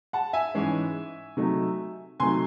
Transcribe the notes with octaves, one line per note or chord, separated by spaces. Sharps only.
F#5 A5
E5 G#5
G#2 E3 G#3 C#4
C3 F#3 A3 D#4
C3 F#3 A3 D#4 G#5 C6